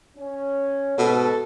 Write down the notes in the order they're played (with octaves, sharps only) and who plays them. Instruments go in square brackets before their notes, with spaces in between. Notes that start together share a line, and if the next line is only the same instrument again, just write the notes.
[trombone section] C#4
[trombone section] G#2 [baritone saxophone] B2 [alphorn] A4